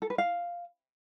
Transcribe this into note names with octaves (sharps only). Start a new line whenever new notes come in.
A4
B4
F5